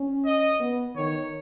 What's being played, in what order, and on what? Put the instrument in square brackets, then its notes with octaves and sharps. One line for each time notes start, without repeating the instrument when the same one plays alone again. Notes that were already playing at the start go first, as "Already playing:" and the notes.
Already playing: [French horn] C#4
[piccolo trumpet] D#5
[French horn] B3
[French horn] D#3 [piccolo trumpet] C#5